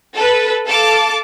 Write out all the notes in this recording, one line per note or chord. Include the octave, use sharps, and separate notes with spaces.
A4 B4
A4 F5 A5 D6